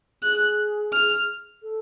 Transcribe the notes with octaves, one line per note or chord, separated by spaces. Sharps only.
G#4 F#6
F6
A4